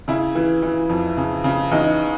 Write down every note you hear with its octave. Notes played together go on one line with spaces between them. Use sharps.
C#3 E4
E3
E3
F2
C#3
C#3
E2 D#4